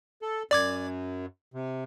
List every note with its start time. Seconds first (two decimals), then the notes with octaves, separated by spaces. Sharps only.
0.22 A4
0.51 F#2 D5 D6 G#6
1.54 C3